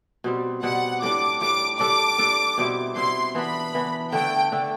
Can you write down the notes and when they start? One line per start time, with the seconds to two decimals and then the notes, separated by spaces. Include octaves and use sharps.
0.24 B2 G3 C4
0.63 B2 G3 C4 F#5
1.02 A2 G3 D4 D6
1.41 A2 G3 D4 D6
1.80 G3 D4 A4 D5 D6
2.18 G3 D4 A4 D5
2.58 B2 G3 C4 E4
2.96 B2 G3 C4 E4 C6
3.35 E3 B3 D4 B5
3.74 E3 B3 D4
4.12 D3 A3 D4 A4 G5
4.52 D3 A3 D4 A4